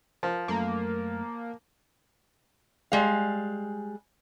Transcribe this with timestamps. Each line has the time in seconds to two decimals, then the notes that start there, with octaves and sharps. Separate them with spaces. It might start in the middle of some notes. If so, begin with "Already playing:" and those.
0.23 F3 A#4
0.48 F#2 A3 A#3
2.92 G3 G#3 F5